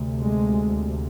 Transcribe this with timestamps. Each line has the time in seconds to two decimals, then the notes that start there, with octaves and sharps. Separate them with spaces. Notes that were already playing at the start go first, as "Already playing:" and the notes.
Already playing: D2 C3
0.21 G#3